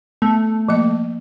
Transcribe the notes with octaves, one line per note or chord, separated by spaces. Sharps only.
A3 B3
F3 A#3 D#5